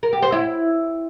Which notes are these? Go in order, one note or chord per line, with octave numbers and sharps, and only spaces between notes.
A#4
G4
C5
E4